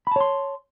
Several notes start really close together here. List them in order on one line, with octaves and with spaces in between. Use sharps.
B5 A5 C#5 C6